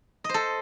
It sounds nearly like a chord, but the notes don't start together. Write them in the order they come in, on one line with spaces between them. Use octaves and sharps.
D#5 C5 A4